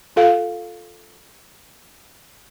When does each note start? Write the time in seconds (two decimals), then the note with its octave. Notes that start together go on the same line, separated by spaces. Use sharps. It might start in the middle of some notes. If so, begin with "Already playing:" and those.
0.16 F4 A4 F5